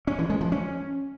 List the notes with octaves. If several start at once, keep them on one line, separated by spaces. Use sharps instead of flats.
C#4
E3
G#3
F3
C#4